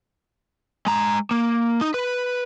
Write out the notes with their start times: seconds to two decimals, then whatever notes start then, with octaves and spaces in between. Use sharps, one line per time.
0.86 G#3 A#5
1.31 A#3
1.81 D#4
1.94 B4